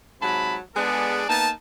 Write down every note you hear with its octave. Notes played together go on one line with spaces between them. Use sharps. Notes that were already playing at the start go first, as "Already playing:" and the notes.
G#2 C3 F#3 A5 B5
G#3 B3 D4 G#4 A4 D5
A#3 B3 D#4 A5